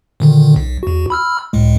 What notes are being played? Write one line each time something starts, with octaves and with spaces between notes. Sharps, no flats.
A#2 D3 D#3
B1
E2 F#4
B5 E6 F6
C#2 A2 G#3